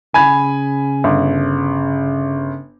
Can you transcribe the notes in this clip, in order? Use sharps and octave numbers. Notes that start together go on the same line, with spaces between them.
C#3 G#5 B5 G#6
G1